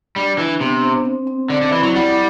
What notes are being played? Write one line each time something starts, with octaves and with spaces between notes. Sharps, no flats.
G3 D4
E3 D4
C3 B3
C5
C4
C4
D3 D5
D3
E3 E4
F#3
G3 F#5